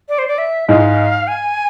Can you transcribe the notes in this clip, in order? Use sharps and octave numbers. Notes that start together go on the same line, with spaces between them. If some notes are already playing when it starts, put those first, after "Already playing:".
D5
C5
D5
E5
G#2 G#3 F5
G#5